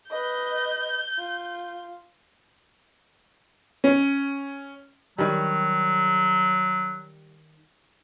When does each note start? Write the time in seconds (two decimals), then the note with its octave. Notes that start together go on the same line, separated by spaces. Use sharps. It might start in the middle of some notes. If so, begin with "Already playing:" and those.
0.10 B4 D#5 G6
1.18 F4
3.84 C#4
5.18 D#3 F#3 G3